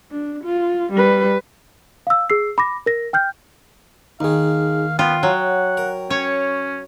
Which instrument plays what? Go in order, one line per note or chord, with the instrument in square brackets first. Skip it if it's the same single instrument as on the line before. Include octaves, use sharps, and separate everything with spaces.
[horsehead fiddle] D4
F4
G3 B4
[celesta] F5 E6
G#4 E6 C7
B5 D6 A#6
A#4 A#6
G5 F6 G6
[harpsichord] D#2 D#3 [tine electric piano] D#4 G#4 [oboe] F5
[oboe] B3 [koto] F4 [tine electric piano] G5
[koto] F#3 [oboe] F#5
[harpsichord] A#4
[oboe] C#4 [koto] C#5